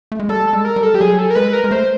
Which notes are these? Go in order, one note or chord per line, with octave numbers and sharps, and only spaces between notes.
A3
G#3
G3 A4
A4
G#3
A#4
G3
A4
G3 G4
F#3 G#4
A4
A#4
G#3 B4
A#4
G#3
A3 C5